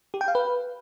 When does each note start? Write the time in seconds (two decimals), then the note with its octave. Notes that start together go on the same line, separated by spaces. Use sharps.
0.14 G4
0.21 G5
0.28 F5
0.35 B4